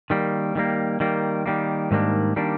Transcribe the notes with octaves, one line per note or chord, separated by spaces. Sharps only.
D#3 G3 A#3
D#3 G3 A#3
D#3 G3 A#3
D#3 G3 A#3
G#2 D#3 G3 A#3 D4
D#3 G3 A#3 D4